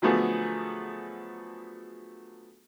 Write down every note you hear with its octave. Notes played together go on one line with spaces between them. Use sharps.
D3 F3 F#3 A3 B3 G#4